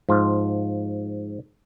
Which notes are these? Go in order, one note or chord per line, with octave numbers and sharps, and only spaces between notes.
G#2 F3 F4